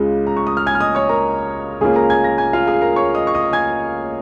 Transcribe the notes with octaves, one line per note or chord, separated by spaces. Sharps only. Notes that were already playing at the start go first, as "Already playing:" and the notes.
Already playing: C#2 C#3 G#3 F4
A#5
C#6
D#6
F6
G#5 G#6
F6
D#5 D#6
C#5 C#6
A#4 A#5
C#2 C#3 A#3 C#4 F4 G#4 G#5
A#4 A#5
G#5 G#6
A#5 A#6
G#5 G#6
F4 F5
G#4 G#5
A#4 A#5
C#5 C#6
D#5 D#6
C#6
D#5 D#6
G#5 G#6